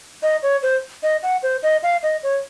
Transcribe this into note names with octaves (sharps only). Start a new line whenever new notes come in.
D#5
C#5
C5
D#5
F#5
C5
D#5
F5
D#5
C#5